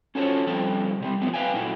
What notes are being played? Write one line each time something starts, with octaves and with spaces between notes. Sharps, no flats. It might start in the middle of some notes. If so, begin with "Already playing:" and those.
C#4 F4 F#4 A4 C5 C#5
D3 F3 G3 C4 A4
C3 G3 C4
F3 A3 B3 C4
B4 E5 F5 G5 G#5
F#2 A#2 A3 E4 F#4